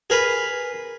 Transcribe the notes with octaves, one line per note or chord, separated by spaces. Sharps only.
G#4 A#4 B4